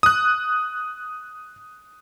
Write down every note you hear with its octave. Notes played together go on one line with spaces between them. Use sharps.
D#6 F#6